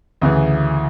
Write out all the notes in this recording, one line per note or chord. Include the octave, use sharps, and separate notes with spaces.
D2 C#3 E3